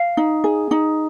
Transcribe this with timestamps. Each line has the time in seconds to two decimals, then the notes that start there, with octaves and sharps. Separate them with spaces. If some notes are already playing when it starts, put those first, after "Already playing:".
Already playing: F5
0.17 D#4
0.44 G#4
0.71 D#4